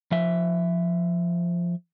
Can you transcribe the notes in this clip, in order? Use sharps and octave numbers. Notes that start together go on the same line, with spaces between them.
F3 E5